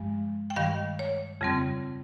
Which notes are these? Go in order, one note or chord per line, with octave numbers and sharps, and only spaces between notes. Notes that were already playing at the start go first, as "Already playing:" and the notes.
Already playing: G2 F3 G#3
G5
G2 D#3 G3 F5
C#5
F2 C#3 G3 C4